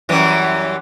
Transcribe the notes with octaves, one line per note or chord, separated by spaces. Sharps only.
F#2 E3 G3